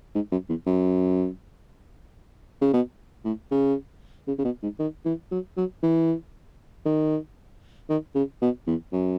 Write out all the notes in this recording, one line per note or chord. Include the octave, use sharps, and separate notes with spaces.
G#2
F#2
E2
F#2
C#3
B2
A2
C#3
C#3
C#3
B2
G#2
D#3
E3
F#3
F#3
E3
D#3
D#3
C#3
B2
E2
F#2